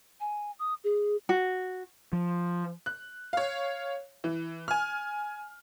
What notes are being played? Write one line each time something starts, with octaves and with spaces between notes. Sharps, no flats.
G#5
D#6
G#4
F#4
F3
F#6
C#5 F5
E3
G#5 F6